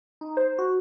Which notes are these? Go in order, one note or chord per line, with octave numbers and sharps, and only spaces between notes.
D#4
C5
F#4